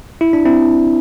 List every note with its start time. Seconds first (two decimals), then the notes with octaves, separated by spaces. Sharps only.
0.21 E4
0.33 D4
0.45 C4 E4